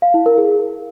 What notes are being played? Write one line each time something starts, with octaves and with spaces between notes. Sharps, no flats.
F5
E4
A#4
G#4